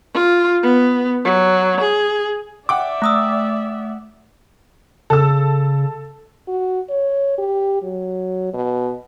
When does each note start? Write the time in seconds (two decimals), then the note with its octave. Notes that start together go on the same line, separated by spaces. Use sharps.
0.14 F4
0.63 B3
1.25 F#3
1.80 G#4
2.69 D5 E5 F#5 G5 D6
3.02 A3 D#6 E6
5.10 C#3 A4 E6
6.48 F#4
6.90 C#5
7.38 G4
7.82 F#3
8.54 B2